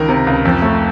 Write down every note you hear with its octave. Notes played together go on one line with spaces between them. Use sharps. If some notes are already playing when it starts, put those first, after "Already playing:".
Already playing: C#2 D#3 A#4
C3
C#2
F2
A3